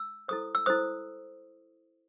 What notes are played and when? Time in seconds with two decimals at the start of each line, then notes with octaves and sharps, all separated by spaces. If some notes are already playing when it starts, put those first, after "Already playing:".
Already playing: E6
0.28 E4 A4 C5 D#6
0.55 E6
0.66 E4 A4 C5 D#6